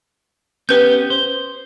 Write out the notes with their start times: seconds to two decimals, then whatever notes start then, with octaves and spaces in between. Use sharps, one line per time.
0.69 B3 C#4 G4 B4 G6
1.10 C5